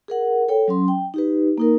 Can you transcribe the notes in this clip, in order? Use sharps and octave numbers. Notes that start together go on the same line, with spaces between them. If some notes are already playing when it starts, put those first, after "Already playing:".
G#4 A#4 F#5
A4 C#5 G5
F#3 C#4 C6
G5
D#4 G4 B4
A#3 D#4 A#4